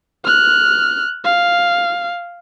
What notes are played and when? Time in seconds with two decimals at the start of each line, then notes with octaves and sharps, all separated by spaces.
0.24 F6 F#6
1.24 F5